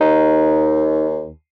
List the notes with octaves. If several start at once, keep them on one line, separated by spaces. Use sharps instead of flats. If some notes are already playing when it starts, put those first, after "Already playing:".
D#2 D#4